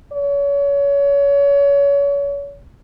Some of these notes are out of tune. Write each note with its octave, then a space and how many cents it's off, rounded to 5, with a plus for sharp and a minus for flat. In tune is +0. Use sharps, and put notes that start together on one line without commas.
C#5 +30